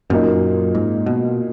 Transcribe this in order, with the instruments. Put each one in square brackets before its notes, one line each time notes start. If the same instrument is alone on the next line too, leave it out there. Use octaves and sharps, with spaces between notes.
[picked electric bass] F#2 [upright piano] A#2 A#3 D#4
[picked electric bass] G#2
B2